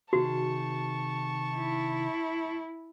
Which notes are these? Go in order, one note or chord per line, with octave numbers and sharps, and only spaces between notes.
C3 D#3 F#4 G#4 A5 C#6
E4